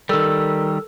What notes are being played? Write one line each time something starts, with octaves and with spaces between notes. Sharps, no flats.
D#3 G3 A4 A#4 E6